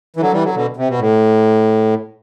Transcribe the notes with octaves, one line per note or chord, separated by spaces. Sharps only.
E3
D3 F#3
E3 G3
D3 F#3
B2 D3
C3
B2
A2